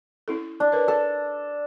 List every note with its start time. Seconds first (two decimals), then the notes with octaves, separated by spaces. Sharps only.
0.28 C#4 E4 A4
0.60 D4
0.72 A#4 B4 C#5
0.88 A4 D5